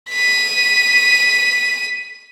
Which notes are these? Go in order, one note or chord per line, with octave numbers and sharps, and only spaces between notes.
B6 D#7